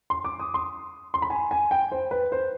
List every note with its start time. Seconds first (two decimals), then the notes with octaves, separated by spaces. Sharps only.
0.10 C6
0.24 D6
0.40 D#6
0.54 C6
1.14 C6
1.22 B5
1.30 G#5
1.51 G#5
1.71 G5
1.92 C5
2.11 B4
2.32 C5